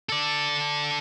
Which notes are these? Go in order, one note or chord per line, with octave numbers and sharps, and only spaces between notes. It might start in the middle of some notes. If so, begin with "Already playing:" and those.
A4 D5